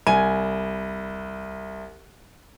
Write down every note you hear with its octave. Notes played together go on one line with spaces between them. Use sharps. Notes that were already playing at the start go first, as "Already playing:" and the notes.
C2 G#5